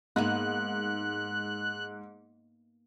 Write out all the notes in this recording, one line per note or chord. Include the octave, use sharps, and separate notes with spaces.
G#2 A#3 B3 D#4 F#6